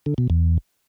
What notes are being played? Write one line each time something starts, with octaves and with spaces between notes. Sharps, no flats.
D3
B2
E2